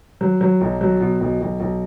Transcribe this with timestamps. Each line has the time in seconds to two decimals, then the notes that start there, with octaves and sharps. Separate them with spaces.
0.21 F#3
0.41 F#3
0.61 B1
0.81 F#3
1.01 B2
1.21 B1
1.41 B1
1.60 B1